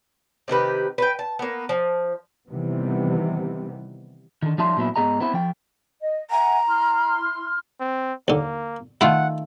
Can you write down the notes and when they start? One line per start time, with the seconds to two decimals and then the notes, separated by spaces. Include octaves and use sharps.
0.48 C3 D#3 G4 B4
0.98 B4 G5
1.19 A5
1.39 A#3 B3
1.69 F3
2.49 C3 D#3 E3 G3 B3
4.43 D3 D#3
4.58 F3 G3 D#4 E5 A5 C6
4.77 A#2 F#3 B3 E4
4.96 G#2 F#3 B3 G#4 D#5 A#5
5.20 B3 C4 E4 B4
5.34 F3 G5
6.00 D#5
6.31 E5 F#5 G#5 A#5
6.67 E4 C6 F6
7.80 C4
8.28 D#2 D3 A#3
9.01 D#3 A3 E4 F4 F#5 B5